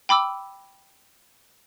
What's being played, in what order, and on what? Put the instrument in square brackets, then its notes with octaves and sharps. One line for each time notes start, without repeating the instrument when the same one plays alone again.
[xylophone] G5 B5 D6 E6